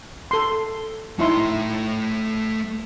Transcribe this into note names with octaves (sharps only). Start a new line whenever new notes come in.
A4 C6
A3 D#4 E4 C#5 C6